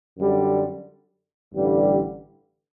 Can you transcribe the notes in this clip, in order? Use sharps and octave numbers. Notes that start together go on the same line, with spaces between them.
F#2 D3 G3
A1 G2 D3 G3